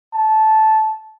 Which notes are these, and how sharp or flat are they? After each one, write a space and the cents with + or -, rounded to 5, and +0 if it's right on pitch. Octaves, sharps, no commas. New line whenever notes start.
A5 -15